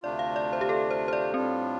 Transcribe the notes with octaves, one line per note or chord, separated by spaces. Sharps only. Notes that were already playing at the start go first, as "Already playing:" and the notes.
D2 C3 A3 D4 F4 D5
F5
D5
C5
G4
A4
C5
C5
D5
A2 G3 C4 D4 F4